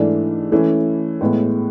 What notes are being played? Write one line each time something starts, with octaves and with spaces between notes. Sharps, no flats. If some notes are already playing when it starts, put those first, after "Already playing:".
Already playing: G#2 E3 A3 D4
E3 A3 C#4
A2 G#3 B3